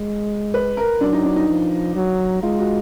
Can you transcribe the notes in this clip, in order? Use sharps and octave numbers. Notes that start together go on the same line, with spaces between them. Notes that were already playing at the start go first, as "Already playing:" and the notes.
Already playing: G#3
B4
A#4
F#3 D4
D#4
D4
D#4
F3
F#3
G#3 F4
F#4